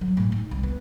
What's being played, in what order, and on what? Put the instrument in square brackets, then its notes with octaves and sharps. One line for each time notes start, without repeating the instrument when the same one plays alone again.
[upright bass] D3 F#3
A2 C#4
D#4
C2
B3